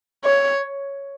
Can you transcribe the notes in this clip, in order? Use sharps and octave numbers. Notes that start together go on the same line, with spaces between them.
C#5